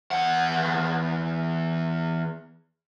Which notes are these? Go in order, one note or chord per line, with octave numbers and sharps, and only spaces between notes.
E2 F#5